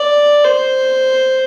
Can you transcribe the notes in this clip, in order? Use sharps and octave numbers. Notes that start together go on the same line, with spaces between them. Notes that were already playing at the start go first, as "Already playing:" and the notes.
Already playing: D5
C5